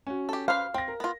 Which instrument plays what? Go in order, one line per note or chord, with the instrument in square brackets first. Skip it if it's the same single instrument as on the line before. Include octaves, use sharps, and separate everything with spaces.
[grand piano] C#4 F#4
[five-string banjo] G4 A4
[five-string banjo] B4 C5 [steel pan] F5
[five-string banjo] C4 [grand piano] G5 A#6
[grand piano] A#4
[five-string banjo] B3 F4